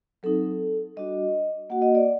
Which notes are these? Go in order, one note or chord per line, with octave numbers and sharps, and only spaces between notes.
F#3 C4 D#4 A4
G3 D4 F#4 D#5
A#3 F#4 F#5
D#5
D5